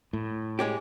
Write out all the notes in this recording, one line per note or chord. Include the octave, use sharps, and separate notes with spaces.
A2
G#3 C#4 G4